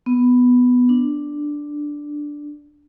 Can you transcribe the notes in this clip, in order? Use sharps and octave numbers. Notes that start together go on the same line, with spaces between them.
B3
D4